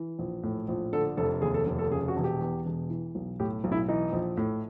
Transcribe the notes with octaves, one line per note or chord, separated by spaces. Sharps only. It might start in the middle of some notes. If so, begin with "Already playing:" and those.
Already playing: E3
A#1
A2
A#1
D3 A4
F1 A4
D#2 G#4
A4
F1
A4
C#3 G#4
F#4
E1
G4
E2
E1
E3
B1
A2 G4
B1
E4
E3 D#4
A#1
A2